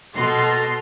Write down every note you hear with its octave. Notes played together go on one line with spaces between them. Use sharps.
B2 A4 A#5 C6